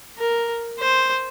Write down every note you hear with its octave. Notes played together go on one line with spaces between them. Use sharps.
A#4
C5